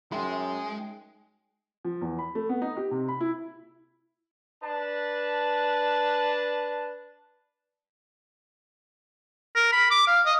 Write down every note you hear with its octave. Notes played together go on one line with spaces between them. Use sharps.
F#2 G#3 D#4 E5 G5 C6
F3
E2
B5
A3
B3
D#4
G4
C3
B5
E4
D4 B4 A5
A#4
B5
D6
F5
D#5